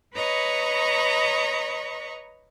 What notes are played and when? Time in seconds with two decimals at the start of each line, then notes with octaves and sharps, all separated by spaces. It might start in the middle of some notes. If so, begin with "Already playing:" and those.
0.14 B4 C#5 D#5 A#5 B5 C#6